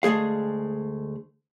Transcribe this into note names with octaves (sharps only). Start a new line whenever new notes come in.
D2 G#3 A3 G#4 F5